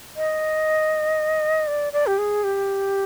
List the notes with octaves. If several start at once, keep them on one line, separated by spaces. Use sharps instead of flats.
D#5
D5
D5
G4
G#4
G4